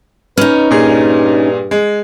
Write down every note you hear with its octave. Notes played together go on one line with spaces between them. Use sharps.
C#4 D#4 B4 F6
G2 A#2 G#4
G#3